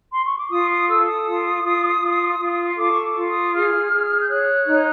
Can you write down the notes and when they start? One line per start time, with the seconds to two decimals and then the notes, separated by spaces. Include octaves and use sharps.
0.12 C6
0.25 C#6
0.37 D6
0.50 F4 D#6
0.69 D#6
0.88 A4 E6
1.06 D#6
1.26 F4
1.64 F4
2.02 F4
2.40 F4
2.77 A4 D6
2.93 C#6
3.02 D6
3.16 F4
3.28 D#6
3.53 G#4 F6
3.91 G#4
4.19 G6
4.29 C#5 F#6
4.67 D#4